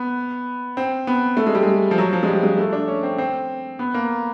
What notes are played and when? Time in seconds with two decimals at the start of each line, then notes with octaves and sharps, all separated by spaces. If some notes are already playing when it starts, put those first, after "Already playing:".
Already playing: B3
0.77 C4
1.07 B3
1.37 A3
1.47 G#3
1.55 G3
1.63 G#3
1.91 F3
1.98 F#3
2.13 F3
2.23 G#3
2.28 G3
2.43 G#3
2.58 A3
2.73 D4
2.88 C#4
3.03 C4
3.18 C4
3.79 B3
3.94 A#3